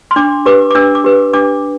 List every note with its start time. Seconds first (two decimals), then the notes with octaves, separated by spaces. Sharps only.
0.11 C6
0.16 D4 D6
0.46 G4 B4 D6
0.71 D6
0.75 D4 E6
0.95 D6
1.04 G4 B4
1.34 D4 D6